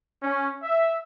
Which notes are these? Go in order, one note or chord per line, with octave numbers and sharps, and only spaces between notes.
C#4
E5